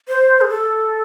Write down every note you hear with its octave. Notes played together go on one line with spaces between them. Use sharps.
C5
G#4
A4